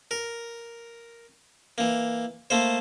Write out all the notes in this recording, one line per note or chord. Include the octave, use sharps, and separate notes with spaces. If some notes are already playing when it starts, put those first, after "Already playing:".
A#4
E3 A#3
A3 A#3 C5